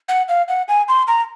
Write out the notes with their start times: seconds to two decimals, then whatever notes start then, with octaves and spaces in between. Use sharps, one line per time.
0.09 F#5
0.29 F5
0.48 F#5
0.68 G#5
0.89 C6
1.08 A#5